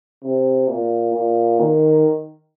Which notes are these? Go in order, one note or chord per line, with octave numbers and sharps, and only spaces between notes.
C3
A#2
A#2
D#3